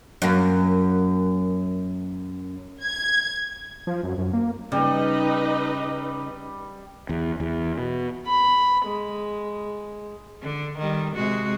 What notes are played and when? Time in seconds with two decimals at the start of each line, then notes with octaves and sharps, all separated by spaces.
0.22 F#2 A#3
2.82 G#6
3.87 F3
4.03 F#2
4.18 F#2
4.33 A#3
4.72 C#3 G3 D#4 B4 D#5
7.09 E2
7.40 E2
7.78 B2
8.26 B5
8.86 G#3
10.42 D3
10.78 D#3 G3
11.15 C3 G#3 F#4